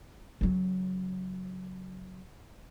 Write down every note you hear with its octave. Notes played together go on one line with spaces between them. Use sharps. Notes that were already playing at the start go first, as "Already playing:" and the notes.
C#3 F#3